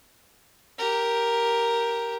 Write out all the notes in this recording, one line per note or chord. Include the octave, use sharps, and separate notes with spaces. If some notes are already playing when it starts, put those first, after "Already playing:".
G4 A#4